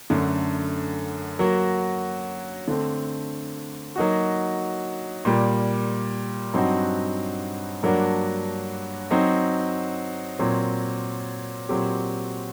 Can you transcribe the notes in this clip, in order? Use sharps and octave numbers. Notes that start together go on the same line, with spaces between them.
F#2 D3 A3
F#3 A#3 F#4
D3 A3 C4
F#3 A#3 D#4 F#4
A#2 G3 A#3
G2 F#3 C4 D#4 F#4
G2 F#3 A#3 D4 F#4
F#3 C4 D#4
A#2 F#3 C4
A#2 F#3 C4 G4